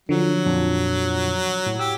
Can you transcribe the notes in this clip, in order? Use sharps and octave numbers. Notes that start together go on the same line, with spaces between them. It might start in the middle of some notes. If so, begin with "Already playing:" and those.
D3 F3 F#3
F2 A#2 D4
A2
G4 E6